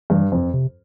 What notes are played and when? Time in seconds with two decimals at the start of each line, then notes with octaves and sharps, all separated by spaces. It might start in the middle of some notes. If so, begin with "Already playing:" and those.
0.10 G2 E3
0.32 F2
0.54 C3